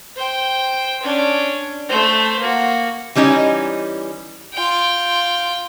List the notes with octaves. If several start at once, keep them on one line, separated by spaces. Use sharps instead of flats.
C5 G5
C#4 D4
A3 C5
A#3 F#4
E3 G3 C#4 D#4
F4 G5